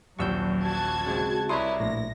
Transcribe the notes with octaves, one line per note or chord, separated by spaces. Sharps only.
D#1 A#1 F#3 C#6 E6 G6
F#4 A5 G#6
C#3 G#3 C4
C2 E4 B4 C#5 A#5 C6 D#6
A#1 A2 A#6